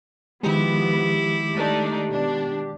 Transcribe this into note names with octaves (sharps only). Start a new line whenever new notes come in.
D#3 F3 G#3 B3 E4 G4
A3 D4 D#4
B2 D4